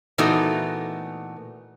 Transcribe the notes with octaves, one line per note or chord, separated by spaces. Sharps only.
A#2 E3 A3 B3 D#4 F#4